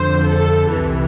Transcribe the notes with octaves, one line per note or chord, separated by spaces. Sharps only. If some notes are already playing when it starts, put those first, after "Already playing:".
Already playing: F2 D3 C5
A4
C2 C3 E3